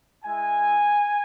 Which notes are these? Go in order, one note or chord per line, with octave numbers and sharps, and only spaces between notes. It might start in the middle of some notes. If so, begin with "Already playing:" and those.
G#3 E4 G#5